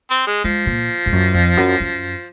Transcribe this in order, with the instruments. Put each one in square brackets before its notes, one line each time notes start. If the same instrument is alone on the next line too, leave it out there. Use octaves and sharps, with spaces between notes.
[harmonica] C4
G#3
[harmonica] F3 [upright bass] G#3
[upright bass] A#2
G#2
F#2
F2
F#2
F#2